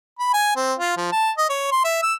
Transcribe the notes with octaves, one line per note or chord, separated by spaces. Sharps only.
B5
G#5
C4
F4
F3
A5
D#5
C#5
C6
E5
E6